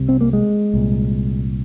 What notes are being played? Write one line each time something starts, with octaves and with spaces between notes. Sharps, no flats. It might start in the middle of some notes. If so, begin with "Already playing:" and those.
Already playing: C2 C3
C4
A#3
G#3
C2 A#2